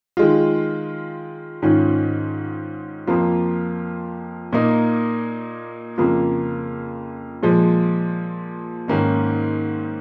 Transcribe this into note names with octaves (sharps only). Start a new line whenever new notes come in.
D#3 G#3 F4
G#2 D#3 C#4 F4
F2 F3 A#3 F4
A#2 A#3 D#4
F2 C#3 A#3 F4
A#2 F3 G#3
G#2 D#3 A#3 C#4